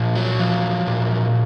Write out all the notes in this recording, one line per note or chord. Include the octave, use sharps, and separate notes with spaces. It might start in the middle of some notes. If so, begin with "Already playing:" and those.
Already playing: A#2 F3
F#3
F3
A#2